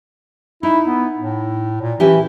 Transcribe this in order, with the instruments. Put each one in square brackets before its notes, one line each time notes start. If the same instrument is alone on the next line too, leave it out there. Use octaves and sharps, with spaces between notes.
[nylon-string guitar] D#4 [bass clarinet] E4
[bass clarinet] B3
A2
A#2
[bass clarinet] E3 [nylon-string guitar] C#4 E4 G4